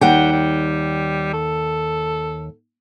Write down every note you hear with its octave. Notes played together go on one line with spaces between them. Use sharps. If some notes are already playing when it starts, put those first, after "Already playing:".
D#2 G3 F#5 G5
G3
A4